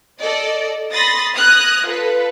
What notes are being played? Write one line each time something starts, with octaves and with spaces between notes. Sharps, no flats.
A4 D5 D#5
B5 C6 D#6 A6 A#6
D#6 F6 F#6 G#6 A#6
F4 A4 B4